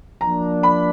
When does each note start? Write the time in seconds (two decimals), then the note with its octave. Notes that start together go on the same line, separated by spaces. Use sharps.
0.21 F3 A#3 D4 A#5
0.63 B5